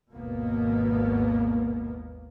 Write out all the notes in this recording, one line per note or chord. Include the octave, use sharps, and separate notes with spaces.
G#1 D#2 B2 A#3 B3